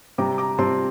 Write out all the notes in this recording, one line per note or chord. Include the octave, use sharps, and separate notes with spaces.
C3 G3 C4 A#5 D6
A#5 D6
C3 G3 C4 A5 C6